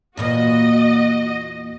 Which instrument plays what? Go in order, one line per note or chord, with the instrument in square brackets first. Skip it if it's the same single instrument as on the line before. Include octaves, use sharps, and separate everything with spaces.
[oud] E2 A#2 A#3 [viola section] F#4 D#5